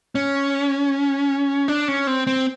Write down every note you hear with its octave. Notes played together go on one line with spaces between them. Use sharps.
C#4
D4
C#4
C4
C4